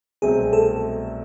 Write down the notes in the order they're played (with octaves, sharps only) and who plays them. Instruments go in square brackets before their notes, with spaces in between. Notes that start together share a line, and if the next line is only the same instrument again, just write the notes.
[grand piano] C2 B2 F#3 A3 C4 [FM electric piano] G#4
[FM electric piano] A4